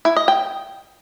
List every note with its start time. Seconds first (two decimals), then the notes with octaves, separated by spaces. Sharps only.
0.05 E4
0.16 D#5
0.28 G5